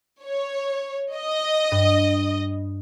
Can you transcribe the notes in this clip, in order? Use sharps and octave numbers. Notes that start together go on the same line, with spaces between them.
C#5
D#5
G2